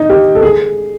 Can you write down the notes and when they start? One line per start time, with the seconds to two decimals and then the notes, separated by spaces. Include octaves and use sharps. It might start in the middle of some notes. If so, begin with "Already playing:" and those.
Already playing: D#4
0.10 G4
0.35 A4
0.42 G#4